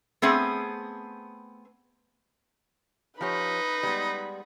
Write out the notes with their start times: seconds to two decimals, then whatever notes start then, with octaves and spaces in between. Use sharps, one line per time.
0.22 A3 B3 C4 G#4
3.21 F3 D#4 G4 B4 C#5 B5
3.83 G3 G#3 B3